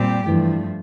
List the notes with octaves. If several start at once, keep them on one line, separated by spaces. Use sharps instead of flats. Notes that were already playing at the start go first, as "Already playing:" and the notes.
Already playing: A#2 G3 C4 G4
G2 E3 F3 A3